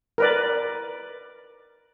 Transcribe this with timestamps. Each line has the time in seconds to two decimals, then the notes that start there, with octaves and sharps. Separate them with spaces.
0.18 A#4 B4 D5